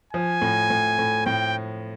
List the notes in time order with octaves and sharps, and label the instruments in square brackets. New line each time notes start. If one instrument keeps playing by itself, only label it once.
[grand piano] F3 [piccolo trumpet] G#5
[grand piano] A2
A2
A2
[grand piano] A2 [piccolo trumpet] G5